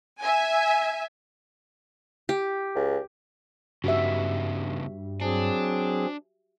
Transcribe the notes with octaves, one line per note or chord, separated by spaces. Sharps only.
E5 G#5
G4
C#2
G2 C#3 B3 D#4 F#4 G4 E5
F#3 C4 D4 G#4